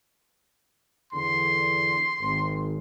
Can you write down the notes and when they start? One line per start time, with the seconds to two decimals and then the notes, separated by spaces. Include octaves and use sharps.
1.13 E2 D3 C6
2.19 G#1